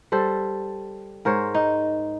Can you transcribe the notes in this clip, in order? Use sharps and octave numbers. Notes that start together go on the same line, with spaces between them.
G3 A4 C5
G#2 A#4 C5 C#5
D#4